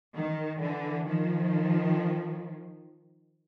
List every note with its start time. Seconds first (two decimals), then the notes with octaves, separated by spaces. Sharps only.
0.15 D#3
0.60 D3 E3
1.07 D#3 F3